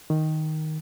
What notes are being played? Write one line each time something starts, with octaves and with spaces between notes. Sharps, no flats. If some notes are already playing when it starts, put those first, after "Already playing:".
D#3